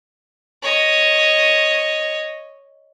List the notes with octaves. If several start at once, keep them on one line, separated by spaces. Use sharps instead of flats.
C#5 D#5